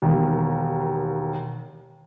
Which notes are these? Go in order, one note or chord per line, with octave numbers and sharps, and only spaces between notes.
E1 D#2